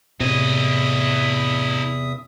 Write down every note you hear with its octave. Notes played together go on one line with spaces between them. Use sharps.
E2 A2 C3 E4 D#5 E5 D#6